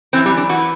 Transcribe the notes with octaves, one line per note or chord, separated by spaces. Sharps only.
F#2 E3 C4
G3
D4
E3 F#4